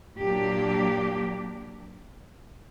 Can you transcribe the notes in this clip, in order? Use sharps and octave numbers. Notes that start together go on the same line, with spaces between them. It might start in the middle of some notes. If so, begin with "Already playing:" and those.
A#2 F#3 A#3 D4 G4